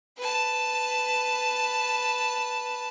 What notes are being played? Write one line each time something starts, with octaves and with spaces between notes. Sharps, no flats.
B4 A5